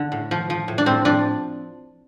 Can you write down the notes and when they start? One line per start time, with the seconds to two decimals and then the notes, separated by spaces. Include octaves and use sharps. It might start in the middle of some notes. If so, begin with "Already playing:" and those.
Already playing: D3
0.12 A2
0.31 F3
0.50 F3
0.68 A2
0.78 D4
0.86 A2 C4
1.05 F3 D4